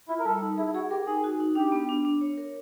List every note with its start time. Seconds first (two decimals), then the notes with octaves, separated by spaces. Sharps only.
0.09 E4 F4
0.20 A#4
0.25 G3 A4
0.41 D#4
0.58 E4 G#4
0.74 F#4 G#4
0.91 G4 A#4
1.07 D#4 G#4
1.24 F#4
1.40 D#4
1.55 D4 G4
1.72 B3
1.89 D4
2.05 D4
2.21 C#5
2.37 A#4